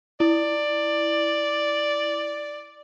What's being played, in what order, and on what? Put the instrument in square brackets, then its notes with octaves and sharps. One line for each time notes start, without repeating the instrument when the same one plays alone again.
[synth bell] E4 [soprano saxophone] D5